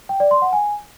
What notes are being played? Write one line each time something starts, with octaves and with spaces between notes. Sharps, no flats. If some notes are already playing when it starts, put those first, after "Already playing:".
G5
D5
C6
F#5
G#5